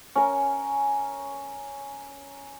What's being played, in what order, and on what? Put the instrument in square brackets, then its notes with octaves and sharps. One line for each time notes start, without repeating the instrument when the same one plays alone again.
[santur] C#4 A#4